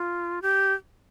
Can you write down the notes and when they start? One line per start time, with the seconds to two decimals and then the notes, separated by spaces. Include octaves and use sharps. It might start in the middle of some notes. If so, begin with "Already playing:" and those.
Already playing: F4
0.42 G4